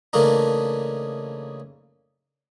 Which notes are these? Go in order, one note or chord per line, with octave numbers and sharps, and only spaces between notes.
C#3 E3 A3 A#3 D4 D#4